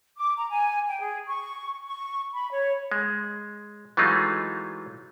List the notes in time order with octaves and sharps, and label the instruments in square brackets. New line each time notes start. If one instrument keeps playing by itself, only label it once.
[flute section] D6
A#5
G#5
G5
G#4
C#6
C#6
B5
C#5
[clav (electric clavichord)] G#3
E3 F#3 G#3 A3 D#4 F4